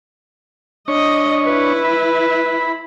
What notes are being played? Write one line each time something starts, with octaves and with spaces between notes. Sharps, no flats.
D4 C#5 D#5 C#6
E4 B4
B5